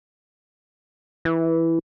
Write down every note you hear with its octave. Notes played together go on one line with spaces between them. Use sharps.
E3